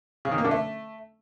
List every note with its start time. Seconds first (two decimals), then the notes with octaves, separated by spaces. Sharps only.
0.25 C#3
0.31 D#3
0.38 A#3
0.45 D3
0.51 A3